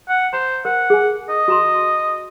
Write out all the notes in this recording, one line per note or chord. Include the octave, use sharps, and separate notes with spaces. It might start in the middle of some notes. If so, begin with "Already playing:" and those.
F#5
C5 A#5
A#4 F#5
G#4 G#5
D#5
F#4 A#5 C6